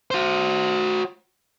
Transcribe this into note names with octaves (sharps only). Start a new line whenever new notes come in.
F#4 C5